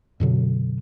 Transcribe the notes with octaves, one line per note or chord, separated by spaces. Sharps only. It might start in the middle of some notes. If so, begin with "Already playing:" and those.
F#2 B2 D3 F#3